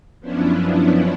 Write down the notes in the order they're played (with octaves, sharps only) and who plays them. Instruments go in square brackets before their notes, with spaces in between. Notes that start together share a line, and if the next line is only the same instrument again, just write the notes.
[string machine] F#2 F3 B3 C#4 D4 E4